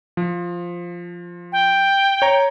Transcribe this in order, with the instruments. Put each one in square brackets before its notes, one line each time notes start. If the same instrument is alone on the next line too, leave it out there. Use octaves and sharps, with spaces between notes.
[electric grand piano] F3
[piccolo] G5
[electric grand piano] C#5 A#5